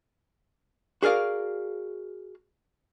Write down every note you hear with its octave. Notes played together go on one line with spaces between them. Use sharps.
F#4 G#4 A#4 D5 F5